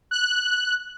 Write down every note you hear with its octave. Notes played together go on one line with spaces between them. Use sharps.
F#6